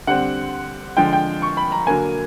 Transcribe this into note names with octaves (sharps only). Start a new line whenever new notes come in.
D3 G3 C4 F#5
D3 F3 G#3 G5
G5
C#6
B5
A#5
D3 F#3 A#3 G#5